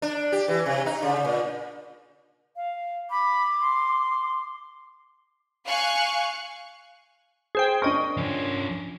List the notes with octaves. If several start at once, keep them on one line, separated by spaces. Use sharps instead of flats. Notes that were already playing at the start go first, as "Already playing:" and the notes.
D4
G4
E3
C3
D#4
C#3
A#2
F5
B5 D6
C6
F5 G#5 C#6 F#6
G#4 C5 G5
D4 A#4 D#5 C#6
F3 C#4